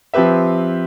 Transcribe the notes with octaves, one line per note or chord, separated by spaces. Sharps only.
F3 C4 G4 B4 E5